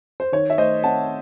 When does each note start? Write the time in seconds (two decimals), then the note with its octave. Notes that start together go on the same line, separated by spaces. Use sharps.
0.20 C5
0.32 D#3 C#5
0.50 E5
0.58 A3 C5 D#5
0.83 C4 F#5 A5